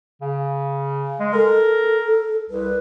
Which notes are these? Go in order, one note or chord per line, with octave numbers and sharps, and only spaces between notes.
C#3
G#3
A4 A#4
C2 B4